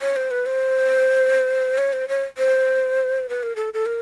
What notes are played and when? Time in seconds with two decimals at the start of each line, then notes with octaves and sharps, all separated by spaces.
0.02 C#5
0.16 C5
0.31 B4
0.46 C5
1.78 C#5
1.93 C5
2.09 C#5
2.38 C5
3.29 B4
3.43 A#4
3.56 A4
3.74 A4
3.86 A#4